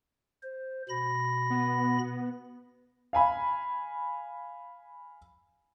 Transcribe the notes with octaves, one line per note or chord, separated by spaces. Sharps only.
C5
B2 B5 A#6
B3
F5 G#5 B5